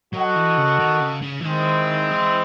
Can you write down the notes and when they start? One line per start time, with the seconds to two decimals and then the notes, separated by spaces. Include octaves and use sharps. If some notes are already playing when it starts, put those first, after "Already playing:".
0.13 F#3 F#4 A4 D#5 F#5
0.35 E3
0.57 C#3
0.79 D#3
1.01 C#3
1.23 C#3
1.41 E3
1.45 D#3 G#3 C4 E4 C5
2.11 E3